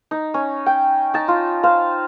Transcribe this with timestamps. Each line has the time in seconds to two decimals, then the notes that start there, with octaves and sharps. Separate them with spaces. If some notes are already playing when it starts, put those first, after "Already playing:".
0.11 D#4
0.34 C#4
0.66 G5
1.14 D#4 A5
1.28 F4
1.63 C5 F5